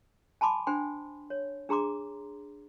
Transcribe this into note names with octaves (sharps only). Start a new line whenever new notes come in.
G#5 A5 B5 C6 D6
D4 C5 G5 G#5 C6
C#5
D4 G#4 A#5 C6 D6